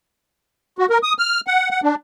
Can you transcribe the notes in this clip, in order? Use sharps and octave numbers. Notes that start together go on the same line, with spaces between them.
F#4
A#4
D#6
F6
F#5
F#5
D4